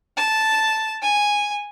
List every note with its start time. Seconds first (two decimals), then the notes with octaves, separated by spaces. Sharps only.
0.17 A5
1.02 G#5